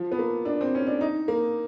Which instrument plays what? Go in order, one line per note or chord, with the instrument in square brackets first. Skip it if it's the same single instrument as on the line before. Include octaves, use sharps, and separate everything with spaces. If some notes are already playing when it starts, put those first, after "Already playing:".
Already playing: [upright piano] F3
B3
A#3
D4
C4
C#4
D4
D#4
A#3